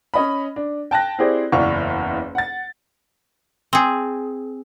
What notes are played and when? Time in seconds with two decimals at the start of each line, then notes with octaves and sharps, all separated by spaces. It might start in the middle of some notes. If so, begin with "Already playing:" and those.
0.14 C#4 D#5 B5
0.56 D4
0.91 G5 A5 F#6 A#6
1.18 C4 E4 G4 G#4 C5 D5
1.52 F#1 E2 E3 D5 F5 C#6
2.35 F#5 A6
3.73 C4 G#4